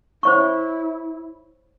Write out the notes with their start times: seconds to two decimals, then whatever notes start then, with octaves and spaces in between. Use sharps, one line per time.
0.23 E4 C5 C#5 C#6